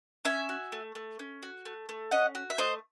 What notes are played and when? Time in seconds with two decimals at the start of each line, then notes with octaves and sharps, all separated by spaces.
0.25 C#4 E5 G#5
0.49 F#4
0.72 A3
0.95 A3
1.19 C#4
1.43 F#4
1.65 A3
1.89 A3
2.11 C#4 D#5 F#5
2.35 F#4
2.50 E5
2.58 A3 C5 D#5